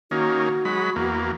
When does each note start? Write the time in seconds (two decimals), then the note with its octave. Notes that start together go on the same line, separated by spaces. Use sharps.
0.11 D#3 A#3 C#4 F#4
0.65 F#3 G#3 B5
0.96 E2 A#3